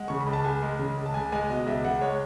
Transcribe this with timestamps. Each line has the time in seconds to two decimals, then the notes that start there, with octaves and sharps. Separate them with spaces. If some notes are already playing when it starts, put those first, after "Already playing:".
Already playing: G#3 F#5
0.08 C#3 C#6
0.21 B5
0.27 C#2
0.33 A5
0.44 C#2 G#5
0.62 G#3
0.79 C#3
0.98 C#2
1.06 A5
1.14 C#2 G#5
1.32 G#3 G#5
1.50 B2 D#5
1.67 C#2 E5
1.84 C#2 F#5
2.01 G#3 C#5